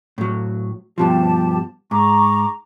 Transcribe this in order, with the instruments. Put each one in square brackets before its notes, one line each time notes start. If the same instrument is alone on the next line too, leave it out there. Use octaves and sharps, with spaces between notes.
[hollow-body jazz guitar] A2 F#3
[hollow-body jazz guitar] G2 B2 F3 [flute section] G4 A5
[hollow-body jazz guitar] G#2 [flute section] A#5 C#6 D6